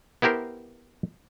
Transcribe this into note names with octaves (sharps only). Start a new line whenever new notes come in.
B3 E4 G4 A#4 C5